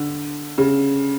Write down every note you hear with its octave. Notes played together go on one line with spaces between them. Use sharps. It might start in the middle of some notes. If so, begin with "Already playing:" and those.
Already playing: D3
C#3